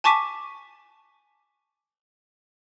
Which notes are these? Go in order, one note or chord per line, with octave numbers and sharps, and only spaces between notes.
G#5 A5 C#6 D6 B6 D#7